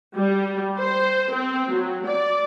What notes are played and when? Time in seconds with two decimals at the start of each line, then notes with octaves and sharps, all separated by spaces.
0.16 G3
0.80 C5
1.33 C4
1.71 F#3
2.06 D5